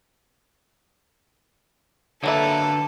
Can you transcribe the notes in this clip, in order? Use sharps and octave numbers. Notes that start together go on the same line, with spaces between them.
D3 F#3 A#3 A4 B4 E5